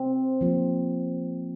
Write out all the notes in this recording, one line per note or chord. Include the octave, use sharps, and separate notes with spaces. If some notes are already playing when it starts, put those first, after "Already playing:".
Already playing: C4
F3 A#3 F4